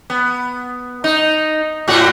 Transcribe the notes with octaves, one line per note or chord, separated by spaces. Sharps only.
B3
D#4
A2 F#4